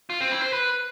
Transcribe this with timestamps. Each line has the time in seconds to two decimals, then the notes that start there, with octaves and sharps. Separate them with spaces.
0.10 F4
0.20 C4
0.31 E4
0.42 C5
0.53 B4